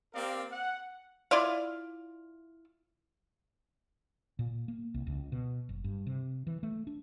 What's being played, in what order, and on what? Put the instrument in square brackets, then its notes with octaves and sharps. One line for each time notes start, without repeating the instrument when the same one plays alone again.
[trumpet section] A#3 C4 G4 A#4 D5 F5
F#5
[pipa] E4 F4 D5 F5
[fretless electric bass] A#2
A#3
C2
C#2
B2
F#1
G2
C3
E3
A3
D4